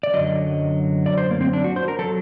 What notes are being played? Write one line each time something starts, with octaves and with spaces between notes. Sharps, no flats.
D5
F#2 D3 F#3 D#5
D5
C5
A#3
C4
D4
F#4
C5
A#4
F#3 A4